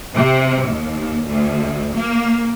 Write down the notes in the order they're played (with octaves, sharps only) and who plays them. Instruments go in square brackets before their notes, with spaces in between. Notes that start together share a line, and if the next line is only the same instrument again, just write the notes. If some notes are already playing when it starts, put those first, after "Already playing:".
[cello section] C3
D#2
D2
A#3